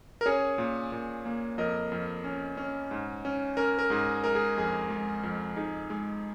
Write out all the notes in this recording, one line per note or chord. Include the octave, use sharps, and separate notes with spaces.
A#4
C#4 G#4 C#5
A#2
A#2
A#3
F2 A#4 D#5
F2
C#4
C#4
G#2
C#4
C#4 A#4
A#4
G#2 G#4
G#3 A#4
G#4
F2 G#4
G#3
F2
D#4 G#4
G#3